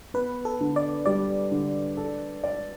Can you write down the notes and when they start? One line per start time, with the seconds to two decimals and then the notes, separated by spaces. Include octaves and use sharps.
0.14 B3 B4
0.45 A4
0.61 D3
0.76 D5
1.06 G3 D5
1.51 D3
1.97 A4
2.44 D5